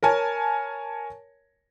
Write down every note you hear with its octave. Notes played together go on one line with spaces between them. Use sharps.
A#4 C#5 G#5 A5